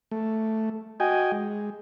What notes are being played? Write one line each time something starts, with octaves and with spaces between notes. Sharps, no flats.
A3
F#4 D#5 G5 G#5
G#3